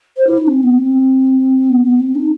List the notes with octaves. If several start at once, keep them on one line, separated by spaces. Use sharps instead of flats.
C5
E4
D#4
C4
B3
C4
B3
B3
C4
D#4